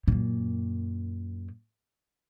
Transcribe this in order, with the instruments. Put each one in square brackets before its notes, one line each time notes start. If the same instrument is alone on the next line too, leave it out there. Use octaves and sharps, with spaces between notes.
[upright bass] F#2 A#2